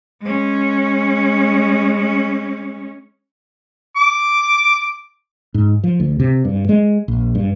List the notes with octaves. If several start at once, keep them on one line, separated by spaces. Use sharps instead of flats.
G#3 C#4
D6
G#2
F3
D2
C3
G2
G#3
A#1
G2